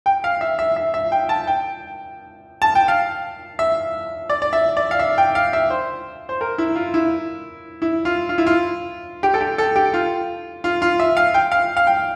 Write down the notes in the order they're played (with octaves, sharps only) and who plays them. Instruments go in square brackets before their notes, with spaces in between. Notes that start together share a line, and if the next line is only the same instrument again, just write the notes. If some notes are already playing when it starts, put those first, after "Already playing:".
[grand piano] G5
F5
E5
E5
E5
E5
G5
A5
G5
A5
G5
F5
E5
D5
D5
E5
D5
F5
E5
G5
F5
E5
C5
C5
A#4
E4
F4
E4
E4
F4
F4
E4
F4
G4
A4
G4
A4
G4
F4
F4
F4
E5
F5
G5
F5
F5
G5